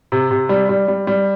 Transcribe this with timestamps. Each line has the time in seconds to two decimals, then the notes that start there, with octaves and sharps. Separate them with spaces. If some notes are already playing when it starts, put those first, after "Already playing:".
0.12 C3
0.31 C3
0.49 G3
0.69 G3
0.88 G3
1.07 G3